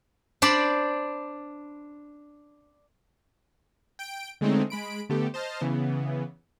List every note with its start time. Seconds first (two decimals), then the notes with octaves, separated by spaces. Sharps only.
0.42 D4 C5 D5 B5
3.99 G5 D7
4.41 D3 G#3 A3 C4 C#4 D#4
4.70 G#3 B5 D7
5.09 D3 A3 B3 G4 A4
5.34 C5 D#5 A5 F6
5.61 C#3 E3 B3